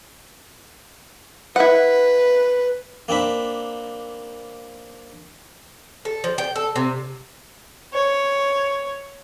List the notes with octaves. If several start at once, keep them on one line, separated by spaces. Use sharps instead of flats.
E4 B4 F#5
A#3 C4 D4 B5
A4
F3
G5
A4
C3
C#5